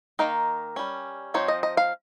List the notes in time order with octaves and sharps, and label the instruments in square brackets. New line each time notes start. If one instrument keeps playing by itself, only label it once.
[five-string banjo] D#3 A#3 D#4 A#4
G3 C#4
F3 C4 D#4 C#5
D#5
D#5
F5